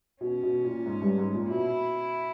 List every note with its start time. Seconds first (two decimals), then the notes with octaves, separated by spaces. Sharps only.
0.21 B2 C#4
0.43 B2
0.65 A#2
0.86 G#2
1.02 G2
1.18 G#2
1.35 A#2
1.50 B2 E4